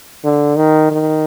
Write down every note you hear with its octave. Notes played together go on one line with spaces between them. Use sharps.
D3
D#3
D#3